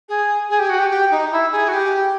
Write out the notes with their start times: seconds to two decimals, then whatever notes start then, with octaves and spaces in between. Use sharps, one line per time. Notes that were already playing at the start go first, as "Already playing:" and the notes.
0.08 G#4
0.49 G#4
0.59 G4
0.69 F#4
0.78 G4
0.90 G4
1.10 D#4
1.31 E4
1.51 G#4
1.68 F#4
1.72 G4